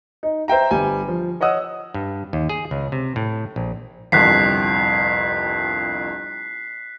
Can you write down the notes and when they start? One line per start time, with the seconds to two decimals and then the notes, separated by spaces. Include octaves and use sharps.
0.23 D#4
0.48 C5 E5 G5 A#5
0.71 G1 G3 G#5
1.08 F3
1.41 C#5 D#5 F#5 D#6 E6
1.94 G2
2.33 D#2
2.49 G#4
2.71 C#2
2.92 C3
3.16 A2
3.56 A#1
4.12 G1 C2 F2 F#6 B6 C7